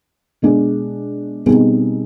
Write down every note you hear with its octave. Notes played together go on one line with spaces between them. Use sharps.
B2 G#3 D4 G#4
B2 G3 C4 D#4 G#4